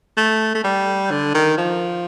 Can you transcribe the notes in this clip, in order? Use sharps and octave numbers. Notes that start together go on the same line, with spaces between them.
A3
A3
G3
D3
D#3
F3